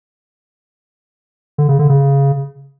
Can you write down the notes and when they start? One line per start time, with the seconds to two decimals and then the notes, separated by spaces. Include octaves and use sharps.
1.58 D3
1.69 C#3
1.79 D3
1.89 C#3